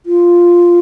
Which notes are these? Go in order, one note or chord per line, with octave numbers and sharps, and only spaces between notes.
F4